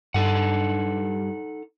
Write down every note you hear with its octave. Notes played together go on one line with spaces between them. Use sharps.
G2 D#4 A4 F#5